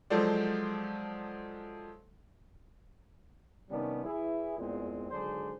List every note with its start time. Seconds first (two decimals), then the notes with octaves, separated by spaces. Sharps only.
0.10 F3 F#3 G#3 A4 C5 D5
3.70 C3 D#3 G3 B3 C#4 D4
4.04 E3 E4 G#4
4.58 E2 G2 A#2 G#3 C4
5.11 G#1 D3 F#3 D4 G#4 C5